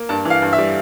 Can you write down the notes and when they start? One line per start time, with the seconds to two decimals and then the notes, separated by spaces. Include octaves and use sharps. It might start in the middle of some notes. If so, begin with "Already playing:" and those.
Already playing: A#3
0.09 G2 A5
0.25 E3
0.30 F5
0.42 G2
0.53 E5
0.58 G3